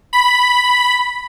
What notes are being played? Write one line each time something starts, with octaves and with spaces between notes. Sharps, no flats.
B5